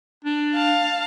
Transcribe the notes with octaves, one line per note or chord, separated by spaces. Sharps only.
D4
F5 A5 F6